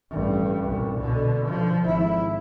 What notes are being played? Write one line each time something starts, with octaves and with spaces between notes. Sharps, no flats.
A1 G2
C2 A#2
B2 D3
D3 F3
G#1 E4